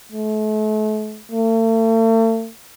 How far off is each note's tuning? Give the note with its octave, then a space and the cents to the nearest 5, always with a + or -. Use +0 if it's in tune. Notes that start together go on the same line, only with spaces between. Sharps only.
A3 -40
A3 +40